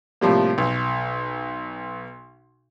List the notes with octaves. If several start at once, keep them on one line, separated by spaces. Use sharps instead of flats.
A2 C3 F3 G3 A#3
B1